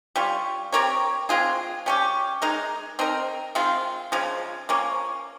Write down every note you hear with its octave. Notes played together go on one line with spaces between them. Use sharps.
G3 C#4 F4
C4 G4 A#4 C#5
G#3 C4 F4 G#4
G3 C#4 G4
G#3 D#4 A#4
C4 D#4 A#4
D#3 G#3 C4 F4
C#3 F3 G#3
F3 A#3 C#4